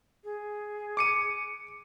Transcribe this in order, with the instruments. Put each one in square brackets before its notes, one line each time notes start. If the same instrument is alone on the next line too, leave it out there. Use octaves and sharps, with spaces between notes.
[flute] G#4
[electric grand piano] D6 C#7 D#7